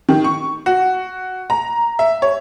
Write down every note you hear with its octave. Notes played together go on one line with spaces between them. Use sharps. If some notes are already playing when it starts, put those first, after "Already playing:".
D#3
C#6
F#4
A#5
E5
C#5